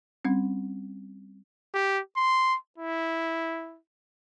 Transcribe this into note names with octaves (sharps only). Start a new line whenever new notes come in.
G3 C4 C#4
G4
C6
E4